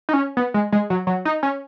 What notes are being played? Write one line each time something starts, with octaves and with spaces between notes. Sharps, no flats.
D#4
C#4
B3
G#3
G#3
F#3
F#3
D#4
C#4